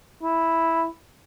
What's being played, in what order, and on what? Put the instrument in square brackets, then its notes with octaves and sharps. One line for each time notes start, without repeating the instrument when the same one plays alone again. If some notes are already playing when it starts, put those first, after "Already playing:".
[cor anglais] E4